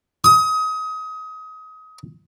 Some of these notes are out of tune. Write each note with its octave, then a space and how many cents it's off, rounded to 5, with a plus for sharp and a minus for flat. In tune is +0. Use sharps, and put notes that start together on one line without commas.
D#6 +25